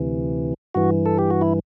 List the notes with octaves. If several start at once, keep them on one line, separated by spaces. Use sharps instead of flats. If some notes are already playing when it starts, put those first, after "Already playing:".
Already playing: D2 C3 E3
G2 E3 F#4
A4
G4
F#4
E4